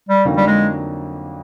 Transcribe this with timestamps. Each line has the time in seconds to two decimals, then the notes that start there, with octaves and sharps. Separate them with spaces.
0.09 G3
0.25 F2 D3 F#3 A#3 D#4
0.37 G3
0.47 G#3